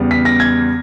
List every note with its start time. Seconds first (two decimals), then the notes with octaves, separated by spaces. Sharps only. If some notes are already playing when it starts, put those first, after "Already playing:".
Already playing: E2 C#3 G3 B3
0.11 B6
0.25 A#6
0.40 G#6